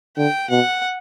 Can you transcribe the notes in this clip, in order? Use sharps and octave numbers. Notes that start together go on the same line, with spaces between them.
D3 G5
B2 F#5